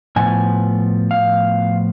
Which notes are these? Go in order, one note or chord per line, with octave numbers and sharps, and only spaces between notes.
A2 F3 B3 G#5
F5